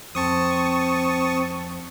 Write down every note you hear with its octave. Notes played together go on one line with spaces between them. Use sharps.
F2 C4 A5 C#6 D#6